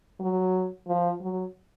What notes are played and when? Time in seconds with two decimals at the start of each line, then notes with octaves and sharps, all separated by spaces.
0.20 F#3
0.87 F3
1.21 F#3